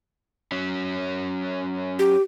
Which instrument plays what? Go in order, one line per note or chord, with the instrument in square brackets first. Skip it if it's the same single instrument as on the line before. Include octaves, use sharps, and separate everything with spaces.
[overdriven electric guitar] F#3 C#4
[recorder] G4